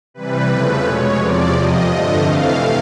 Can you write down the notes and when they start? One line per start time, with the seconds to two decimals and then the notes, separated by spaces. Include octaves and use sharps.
0.14 C3 E3 G3 B4
0.49 E2 C#3 F3 A3
0.83 B2 G#3 C#5
1.18 E2 C3 F3 D5
1.52 F2 C3 F3 D#5
1.87 G2 D3 F3 A3
2.22 C3 E3 A3 F5